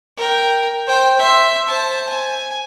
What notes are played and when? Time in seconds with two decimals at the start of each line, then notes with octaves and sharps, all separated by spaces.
0.17 A#4 G5
0.87 C5 G5
1.18 E5 C6
1.68 C5 A5
2.09 G#5